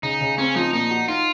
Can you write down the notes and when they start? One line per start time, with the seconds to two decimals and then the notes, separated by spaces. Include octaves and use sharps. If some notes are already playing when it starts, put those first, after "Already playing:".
0.03 C#3 D#4
0.21 C#3
0.38 C4 C#4
0.56 F3 D#4
0.73 A#2 D#4
0.91 F#4
1.08 D#4 F4